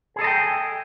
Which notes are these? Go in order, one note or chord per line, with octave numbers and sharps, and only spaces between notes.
G#4 A4 D#5 G5 A#5